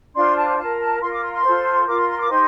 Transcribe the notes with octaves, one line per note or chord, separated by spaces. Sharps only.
D4 F4 C5 C6
A5
F4 A#4 A5
A5
F4 A#4 C6
D6
C6
C6
F4 A4 C5
F4 A#4 D6
C6
C6
D6
D#4 G4 C5 C6